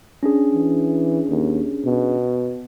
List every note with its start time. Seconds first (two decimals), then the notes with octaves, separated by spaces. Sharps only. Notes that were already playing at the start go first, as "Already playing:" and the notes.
0.23 C#4 D4 G#4
0.53 E3
1.28 D#2
1.85 B2